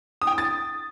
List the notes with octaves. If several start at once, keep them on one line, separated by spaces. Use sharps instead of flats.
D#6
G5
D#6
A6